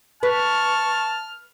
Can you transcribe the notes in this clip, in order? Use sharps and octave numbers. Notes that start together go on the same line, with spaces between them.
B4 A5 C#6 F6